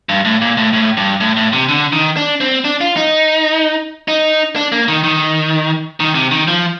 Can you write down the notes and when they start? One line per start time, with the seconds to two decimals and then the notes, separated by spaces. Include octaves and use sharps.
0.09 G2
0.25 A2
0.42 A#2
0.57 A2
0.73 A2
0.97 G2
1.21 A2
1.37 A2
1.53 C3
1.69 D3
1.92 D#3
2.17 D4
2.41 C4
2.65 D4
2.81 F4
2.96 D#4
4.08 D#4
4.56 D4
4.72 A#3
4.88 D#3
5.04 D#3
6.00 D#3
6.15 C3
6.31 D#3
6.48 F3